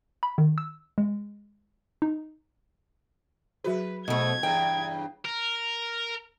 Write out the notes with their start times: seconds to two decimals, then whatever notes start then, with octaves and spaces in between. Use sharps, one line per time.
0.23 B5
0.38 D#3
0.58 E6
0.98 G#3
2.02 D#4
3.64 F#3 F#4 G#4 B4
4.08 G#2 B2 A3 D#5 G#6
4.43 E2 G2 C#3 G5
5.25 A#4